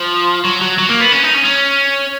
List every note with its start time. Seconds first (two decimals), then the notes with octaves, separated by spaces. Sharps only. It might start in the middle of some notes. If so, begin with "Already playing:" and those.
Already playing: F3
0.45 F#3
0.61 F#3
0.79 F#3
0.89 A#3
1.00 B3
1.12 C#4
1.23 D#4
1.34 C#4
1.45 C#4